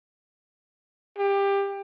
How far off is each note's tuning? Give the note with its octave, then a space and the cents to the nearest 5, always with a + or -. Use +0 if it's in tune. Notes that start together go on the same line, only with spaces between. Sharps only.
G4 +20